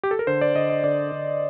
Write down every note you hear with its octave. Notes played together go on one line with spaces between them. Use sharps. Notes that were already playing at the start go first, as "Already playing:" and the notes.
G4
A4
A#4
D3 C5
D5
D3 D#5
D#5
D3 D5
D3